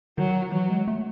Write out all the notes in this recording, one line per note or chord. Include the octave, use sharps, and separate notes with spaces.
D#3 F#3
E3 F#3
G#3
A3